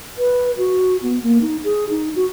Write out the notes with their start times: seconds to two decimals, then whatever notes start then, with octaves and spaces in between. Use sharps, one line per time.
0.18 B4
0.57 F#4
1.02 B3
1.23 A#3
1.41 D#4
1.64 G#4
1.90 D#4
2.16 F#4